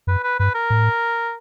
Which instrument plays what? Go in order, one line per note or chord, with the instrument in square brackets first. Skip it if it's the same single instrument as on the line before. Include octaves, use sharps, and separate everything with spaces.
[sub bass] F#2 [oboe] B4
[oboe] B4
[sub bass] G2 [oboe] B4
[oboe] A#4
[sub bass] A2